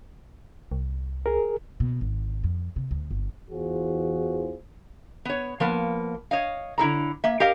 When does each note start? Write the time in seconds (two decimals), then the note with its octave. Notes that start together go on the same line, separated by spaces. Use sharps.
0.72 C2
1.26 G#4 A#4
1.80 B2
2.01 G#1
2.44 F2
2.76 C3
2.91 D2
3.11 G1
3.51 E2 E3 F4 F#4 G#4 C5
5.25 B3 C#5
5.60 F3 A#3 B3
6.31 C#5 D#5 F5
6.78 D3 E4 A4 A#5
7.24 A#3 E5
7.40 G4 A#4 D#5 F5